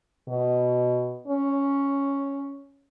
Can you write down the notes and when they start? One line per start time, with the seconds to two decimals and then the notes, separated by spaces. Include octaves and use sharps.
0.28 B2
1.27 C#4